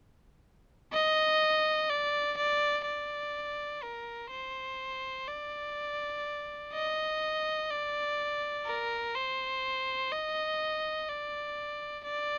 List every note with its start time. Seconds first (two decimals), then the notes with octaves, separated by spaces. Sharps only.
0.93 D#5
1.90 D5
2.37 D5
2.86 D5
3.83 A#4
4.31 C5
5.28 D5
6.73 D#5
7.70 D5
8.66 A#4
9.15 C5
10.12 D#5
11.09 D5
12.05 D5